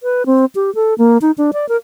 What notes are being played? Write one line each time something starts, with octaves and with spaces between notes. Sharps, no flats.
B4
C4
G4
A4
A#3
D#4
D4
D5
A#4